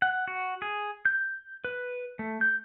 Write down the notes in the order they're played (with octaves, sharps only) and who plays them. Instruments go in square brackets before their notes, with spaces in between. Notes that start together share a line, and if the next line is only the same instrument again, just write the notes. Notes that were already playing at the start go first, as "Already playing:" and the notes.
[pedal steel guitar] F#5
F#4
G#4
G6
B4
A3
G6